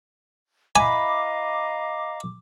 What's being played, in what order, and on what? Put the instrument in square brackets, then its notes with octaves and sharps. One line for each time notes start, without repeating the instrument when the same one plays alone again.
[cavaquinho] E4 B4 B5 [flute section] D#5 F5 A#5 [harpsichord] G#5 [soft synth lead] D6